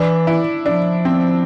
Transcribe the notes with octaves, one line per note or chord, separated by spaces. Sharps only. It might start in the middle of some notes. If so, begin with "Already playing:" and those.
Already playing: E3 D4
E4
F3 D4
C4